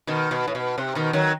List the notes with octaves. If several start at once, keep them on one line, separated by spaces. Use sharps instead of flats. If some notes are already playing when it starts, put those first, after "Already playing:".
B2 D#3
B2
A2
B2
C3
B2 D#3
D#3 F#3